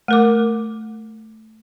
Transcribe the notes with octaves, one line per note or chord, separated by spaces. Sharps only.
A3 A#4 D6